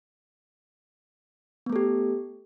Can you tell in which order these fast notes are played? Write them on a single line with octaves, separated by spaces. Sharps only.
B3 A3 A4 G4